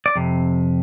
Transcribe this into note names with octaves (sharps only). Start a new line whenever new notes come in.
D5
F2 C3